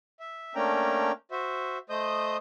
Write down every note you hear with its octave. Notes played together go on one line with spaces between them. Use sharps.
E5
A3 A#3 C#4 D4 G5 A#5
F#4 C5 E5
A3 C5 D#5 D#6 G6